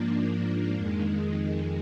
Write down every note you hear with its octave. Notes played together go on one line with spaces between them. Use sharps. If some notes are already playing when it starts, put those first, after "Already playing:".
Already playing: G#2 F3 A#3 D4
F2 D#3 G#3